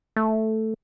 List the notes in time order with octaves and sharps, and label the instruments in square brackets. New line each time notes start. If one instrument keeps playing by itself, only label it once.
[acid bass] A3